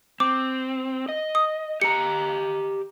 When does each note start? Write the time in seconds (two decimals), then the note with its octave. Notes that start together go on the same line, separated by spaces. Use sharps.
0.20 C4 D6
1.09 D#5
1.35 D#6
1.82 G4 D#5 A#5 C#7